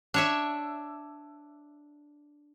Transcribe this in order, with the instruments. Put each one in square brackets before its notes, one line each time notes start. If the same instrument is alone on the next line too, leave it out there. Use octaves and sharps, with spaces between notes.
[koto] D4 C#5 E5